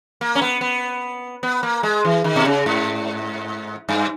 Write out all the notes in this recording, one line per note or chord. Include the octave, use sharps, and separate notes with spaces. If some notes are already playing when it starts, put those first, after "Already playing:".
A#3
C#4
B3
B3
B3
A#3
G#3
E3
D#3
B2
C#3
G#2
G2